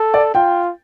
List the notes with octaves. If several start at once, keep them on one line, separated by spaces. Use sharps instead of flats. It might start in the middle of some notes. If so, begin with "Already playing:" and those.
Already playing: A4
D5
F4 G5